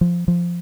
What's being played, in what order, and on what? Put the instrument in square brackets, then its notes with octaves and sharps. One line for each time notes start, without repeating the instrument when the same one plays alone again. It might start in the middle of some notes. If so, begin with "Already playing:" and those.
[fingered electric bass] F3
F3